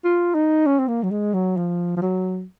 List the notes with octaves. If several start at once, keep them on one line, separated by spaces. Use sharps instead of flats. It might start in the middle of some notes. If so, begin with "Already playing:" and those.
F4
D#4
C#4
C4
A#3
F#3
G#3
F#3
F3
F3
F#3